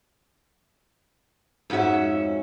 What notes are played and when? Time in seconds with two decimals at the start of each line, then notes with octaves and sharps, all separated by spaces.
1.70 F2 G#2 C#4 F#4 E5